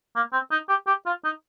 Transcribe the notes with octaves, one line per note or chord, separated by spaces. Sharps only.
A#3
C4
D#4
G4
G4
F4
D#4